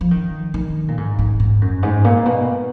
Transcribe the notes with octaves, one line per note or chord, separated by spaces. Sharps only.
F3
D#3
D#3
A#2
G#2
G#2
G#2
F#2
G#2
A#2
B2